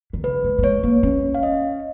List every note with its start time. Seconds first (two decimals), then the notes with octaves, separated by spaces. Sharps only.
0.13 D#3
0.24 C#3 B4
0.44 G#3
0.59 A#3
0.63 G#3 C#5
0.83 A#3
1.03 C#4
1.35 F5
1.43 D#5